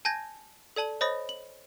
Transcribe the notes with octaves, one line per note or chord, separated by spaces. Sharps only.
G#5 A5 G6 G#6 A#6
A4 D5 A5 F#7
C5 C#5 D#5 B5 D#6 A#6
F#7